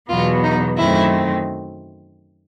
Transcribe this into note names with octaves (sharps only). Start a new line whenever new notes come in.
E2 B2 F#3 B3 F4
D#4
F#2 D#3 F#3 A3 C4 E4